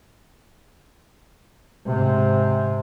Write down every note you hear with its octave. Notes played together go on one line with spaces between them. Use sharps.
G#2 C3